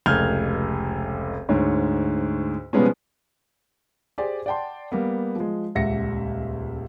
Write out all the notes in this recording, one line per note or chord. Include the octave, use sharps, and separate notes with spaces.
F1 C#2 F6 G6 G#6 F7
D2 G#2 C#5
B2 F3 G3 G#3 B3 C#4
G4 G#4 C5 D5 G#5 C6
D5 F#5 G5 A5 C6
G3 A#3 B3
F3 G#3
D#1 C#2 E5 F#5 A#6 C#7